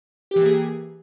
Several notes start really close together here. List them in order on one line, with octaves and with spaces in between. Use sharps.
G4 E3 A#3 G#4